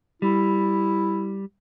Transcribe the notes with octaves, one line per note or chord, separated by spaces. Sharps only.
G3 E4